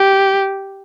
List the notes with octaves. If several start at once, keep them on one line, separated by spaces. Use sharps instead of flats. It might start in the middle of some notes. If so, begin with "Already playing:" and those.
Already playing: G4